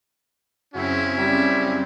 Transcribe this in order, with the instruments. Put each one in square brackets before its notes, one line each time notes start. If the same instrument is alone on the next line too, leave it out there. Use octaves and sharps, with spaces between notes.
[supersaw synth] F#2 C#3 C4 [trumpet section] C#4 E4 [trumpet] F#4
[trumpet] G3